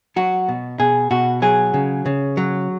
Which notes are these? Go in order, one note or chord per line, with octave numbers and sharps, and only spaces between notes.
F#3 F#4
B2
B2 G#4
B2 F#4
F#3 G#4
C#3
C#3
F#3